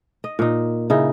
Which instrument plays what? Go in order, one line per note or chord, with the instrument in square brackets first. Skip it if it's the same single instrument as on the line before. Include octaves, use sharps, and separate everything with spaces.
[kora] D#5
A#2 D#4
C#3 D#4 E4